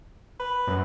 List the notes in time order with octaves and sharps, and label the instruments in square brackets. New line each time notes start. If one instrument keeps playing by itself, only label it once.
[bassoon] B4
[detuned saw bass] F#2